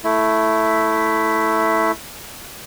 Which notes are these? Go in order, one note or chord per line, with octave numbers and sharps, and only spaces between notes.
A3 E4